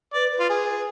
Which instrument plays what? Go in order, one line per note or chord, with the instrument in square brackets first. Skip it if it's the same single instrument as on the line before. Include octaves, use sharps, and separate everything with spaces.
[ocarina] B4 [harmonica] D5
[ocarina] B4
[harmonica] F4
G#4